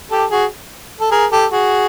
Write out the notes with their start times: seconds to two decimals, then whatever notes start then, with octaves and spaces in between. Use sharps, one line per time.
0.11 G4 A4
0.31 F#4 G#4
1.00 A4
1.11 G#4 A#4
1.32 G4 A4
1.51 F#4 G#4